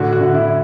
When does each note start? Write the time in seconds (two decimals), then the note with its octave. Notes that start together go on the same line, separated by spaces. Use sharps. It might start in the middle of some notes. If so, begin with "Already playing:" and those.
Already playing: A2 D3 F#4
0.13 F#4
0.21 D3
0.34 E4